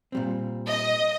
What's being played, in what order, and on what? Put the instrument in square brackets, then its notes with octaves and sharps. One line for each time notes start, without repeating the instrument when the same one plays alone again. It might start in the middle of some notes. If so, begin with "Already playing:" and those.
[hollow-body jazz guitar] A#2 G3 C4
[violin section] D#5